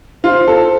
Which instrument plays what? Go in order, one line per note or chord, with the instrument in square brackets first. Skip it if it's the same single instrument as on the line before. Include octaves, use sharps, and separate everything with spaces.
[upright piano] F4 [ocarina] C5
[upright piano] A4